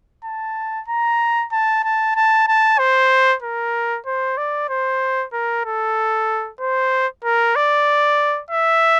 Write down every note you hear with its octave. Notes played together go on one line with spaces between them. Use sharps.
A5
A#5
A5
A5
A5
A5
C5
A#4
C5
D5
C5
A#4
A4
C5
A#4
D5
E5